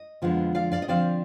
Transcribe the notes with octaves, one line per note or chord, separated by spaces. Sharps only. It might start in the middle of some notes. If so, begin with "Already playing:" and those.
Already playing: D#5
F2 D3 F3 G#3 B3
D5 F5
D5 F5
D#5
D3 F3 C4 D5 F5